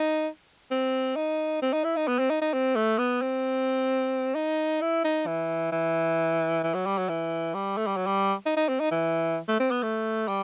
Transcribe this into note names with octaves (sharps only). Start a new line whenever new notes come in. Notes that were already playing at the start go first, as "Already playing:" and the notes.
Already playing: D#4
C4
D#4
C4
D#4
E4
D#4
B3
C4
D#4
D#4
C4
A3
B3
C4
D#4
E4
D#4
E3
E3
E3
F#3
G3
F#3
E3
G3
A3
G3
F#3
G3
D#4
D#4
C4
D#4
E3
A3
C4
B3
A3
G3